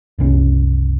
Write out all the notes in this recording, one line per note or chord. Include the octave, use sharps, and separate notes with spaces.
F#1 C2 C#4